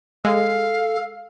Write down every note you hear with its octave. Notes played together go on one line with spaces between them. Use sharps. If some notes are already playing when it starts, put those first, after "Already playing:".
G#3 A4 F5